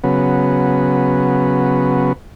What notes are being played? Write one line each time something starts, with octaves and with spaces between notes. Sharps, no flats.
C#3 F#3 B3